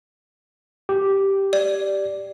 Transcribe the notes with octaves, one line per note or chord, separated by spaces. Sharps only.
G4
D5